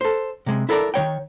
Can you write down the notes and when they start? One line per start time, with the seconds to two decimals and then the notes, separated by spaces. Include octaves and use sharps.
0.01 A4 C5
0.46 C3 G#3
0.69 E4 A4 A#4 D5
0.94 D#3 E3 C#5 G5